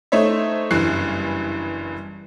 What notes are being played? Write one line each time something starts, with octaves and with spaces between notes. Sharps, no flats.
A3 D#4 C5 C#5 E5
F#1 G2 E3 F#6 C7